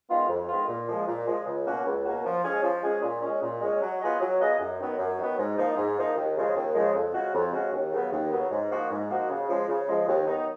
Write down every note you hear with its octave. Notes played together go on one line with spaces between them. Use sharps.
D#3 G#3 B3 F4
F2
D#3 G#3 B3 F4
A#2
F3 G#3
A#2
F3 G#3
C#2
B2 A#3 C#4 F#4
C#2
B2 A#3 C#4 F#4
F3
G#3 C#4 G#4
F3
G#3 C#4 G#4
A#2
G#3 C#4
A#2
G#3 C#4
F#3
B3 F4 G#4 D#5
F#3
B3 F4 G#4 D#5
F#2
D#3 F#3 B3
F#2
D#3 F#3 B3
G#2
F3 A#3 D#4
G#2
F3 A#3 D#4
D#2
C#3 F3 G#3
D#2
C#3 F3 G#3
F2
C#3 G#3 C#4 F#4
F2
C#3 G#3 C#4 F#4
D#2
C#3 F#3 B3
D#2
C#3 F#3 B3
G#2
F3 A#3 D#4 F#4
G#2
F3 A#3 D#4 F#4
C#3
F3 G#3
C#3
F3 G#3
D#2
D#3 F#3 B3 D#4